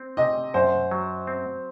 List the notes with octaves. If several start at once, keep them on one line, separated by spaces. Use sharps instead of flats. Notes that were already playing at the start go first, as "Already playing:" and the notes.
Already playing: C4
C3 D#5
F#2 C5
F#3
C4